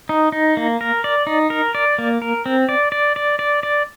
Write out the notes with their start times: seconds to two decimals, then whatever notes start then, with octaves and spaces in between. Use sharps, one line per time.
0.09 D#4
0.32 D#4
0.57 A#3
0.81 A#4
1.04 D5
1.27 D#4
1.50 A#4
1.75 D5
1.98 A#3
2.22 A#4
2.46 C4
2.69 D5
2.92 D5
3.16 D5
3.39 D5
3.63 D5